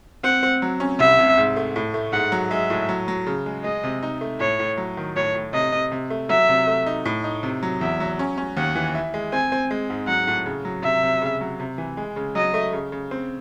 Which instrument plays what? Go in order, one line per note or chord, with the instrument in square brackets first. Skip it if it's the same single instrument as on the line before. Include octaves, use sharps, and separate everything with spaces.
[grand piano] C4 [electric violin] F#5
[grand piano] C4
F#3
C#4
[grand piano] C2 [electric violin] E5
[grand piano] C3
G#2
A3
A2
A3
[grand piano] G#2 [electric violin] F#5
[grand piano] F#3
[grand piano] G#3 [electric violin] E5
[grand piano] A2
F#3
F#3
C#3
G#3
[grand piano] G#3 [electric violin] D#5
[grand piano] C3
D#4
A3
[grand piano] A2 [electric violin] C#5
[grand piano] A2
F#3
D#3
[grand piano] A2 [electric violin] C#5
[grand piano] A2
[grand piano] C3 [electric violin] D#5
[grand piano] C3
C3
A3
[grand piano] F#3 [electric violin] E5
[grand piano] C3
A3
D#4
A2
D#4
C3
F#3
[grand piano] E2 [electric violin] E5
[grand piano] F#3
C#4
C#4
[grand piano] D#2 [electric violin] F#5
[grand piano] E3
E4
G#3
[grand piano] C4 [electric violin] G#5
[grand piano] C4
G#3
G#2
[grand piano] F#3 [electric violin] F#5
[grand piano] A2
C#3
F#3
[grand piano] C3 [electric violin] E5
[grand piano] C3
C#3
F#3
C3
E3
G#3
C#3
[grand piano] F#3 [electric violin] D#5
[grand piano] A3
C#3
C#3
C4